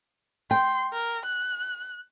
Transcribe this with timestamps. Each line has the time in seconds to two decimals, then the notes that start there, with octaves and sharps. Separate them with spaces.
0.51 G5 C6
0.93 A#4
1.25 F#6